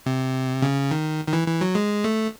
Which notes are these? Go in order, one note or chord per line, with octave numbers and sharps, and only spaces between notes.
C3
C#3
D#3
D#3
E3
E3
F#3
G#3
A3